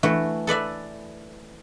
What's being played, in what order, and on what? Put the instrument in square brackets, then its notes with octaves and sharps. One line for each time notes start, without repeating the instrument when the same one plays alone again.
[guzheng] E3 A3 F#4
A4 B4 D5 E5